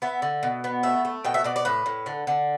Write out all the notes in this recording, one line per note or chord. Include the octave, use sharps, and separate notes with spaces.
B3 E5
D3
B2
B3
A3 E5
A3
B2 G5
E5
B2 D5
D5
A2 B4
A2
D3
D3